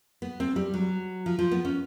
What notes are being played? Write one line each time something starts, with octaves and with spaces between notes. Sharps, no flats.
B3
C4
G3
F#3
F3
F3
B3
C#4